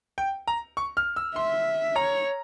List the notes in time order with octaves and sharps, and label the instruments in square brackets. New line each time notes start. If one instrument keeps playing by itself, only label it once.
[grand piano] G5
A#5
C#6
F6
E6
[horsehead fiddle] E5 [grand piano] C6
[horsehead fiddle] C#5 [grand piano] A#5